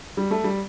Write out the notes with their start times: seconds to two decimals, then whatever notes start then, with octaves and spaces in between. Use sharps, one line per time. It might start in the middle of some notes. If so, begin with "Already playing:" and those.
0.17 G3
0.31 A3
0.44 G3